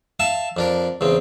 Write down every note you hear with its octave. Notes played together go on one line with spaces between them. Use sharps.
E5 F5 A5
F2 D4 A#4
E2 C#3 C4